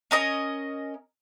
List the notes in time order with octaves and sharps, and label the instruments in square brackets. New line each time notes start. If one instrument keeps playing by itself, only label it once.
[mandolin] C#4 A#4 D#5